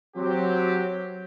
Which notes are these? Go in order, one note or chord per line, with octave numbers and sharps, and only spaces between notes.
F#3 C4 G4